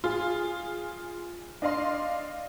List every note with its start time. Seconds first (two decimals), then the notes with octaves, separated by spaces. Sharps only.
0.04 F4 G#4
1.62 D4 D#5 F5 C6